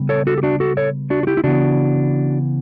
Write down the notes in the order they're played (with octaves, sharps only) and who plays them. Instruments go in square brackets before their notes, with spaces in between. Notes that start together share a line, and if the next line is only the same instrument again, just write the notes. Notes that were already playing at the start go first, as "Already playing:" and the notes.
Already playing: [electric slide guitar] C#3 G3 B3
A4 C#5
F#4 A4
G4
D4 F#4
F#4 A4
A4 C#5
D4 F#4
F#4
E4 G4
E4
C#3 E3 B3 D4 F#4